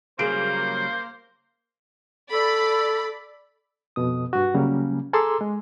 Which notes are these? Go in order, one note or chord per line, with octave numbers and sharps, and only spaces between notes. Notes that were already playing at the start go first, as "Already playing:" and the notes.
C#3 F#3 G3 A#3 G#4 C5 D7
A4 D5 B5
F2 B2 D#6
G2 F#4
C#3 F#3 G3 A#3 C#4
G#4 A4 A#5 C6 D6 E6
G#3